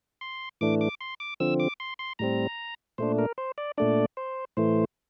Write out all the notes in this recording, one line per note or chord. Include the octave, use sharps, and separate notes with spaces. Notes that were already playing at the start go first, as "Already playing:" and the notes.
C6
A2 E3 A3 D4 D6
D6
C6
D6
D3 F3 C4 E6
D6
C6
C6
A2 G3 C4 A#5
A#2 A3 D4 C5
A#4
C5
D5
A#2 A3 D4 D5
C5
A2 E3 A3 C5